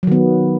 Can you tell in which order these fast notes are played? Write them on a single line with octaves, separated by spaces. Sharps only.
F#3 D#3 B3